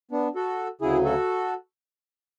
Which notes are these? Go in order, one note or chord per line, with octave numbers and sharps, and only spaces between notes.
B3 D4
F#4 A4
D2 C#3 F#3 E4 G#4
F#4 A4